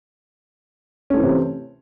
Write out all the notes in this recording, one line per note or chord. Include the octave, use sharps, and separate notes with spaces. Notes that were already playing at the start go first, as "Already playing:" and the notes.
C3 E3 A3 C4 C#4